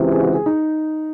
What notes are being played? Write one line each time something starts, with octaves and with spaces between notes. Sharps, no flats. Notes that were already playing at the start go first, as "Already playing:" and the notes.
Already playing: C#2 C3 E3
G#4
F#4
G#4
D#4